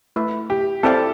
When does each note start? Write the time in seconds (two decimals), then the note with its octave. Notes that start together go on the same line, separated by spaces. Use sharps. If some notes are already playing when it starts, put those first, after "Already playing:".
0.16 A3 E4 B4 E5
0.50 G4
0.83 C4 E4 G4 A4 D5 F5